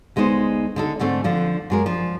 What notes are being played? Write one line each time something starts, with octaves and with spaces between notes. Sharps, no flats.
D2 G#3 B3 D#4 C5
D3 D#4 A4
G#2 D3 A3 C4
D3 F3 D4
F#2 G#3 A#4
F3 D4